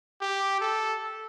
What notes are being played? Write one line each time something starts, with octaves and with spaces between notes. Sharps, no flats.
G4
A4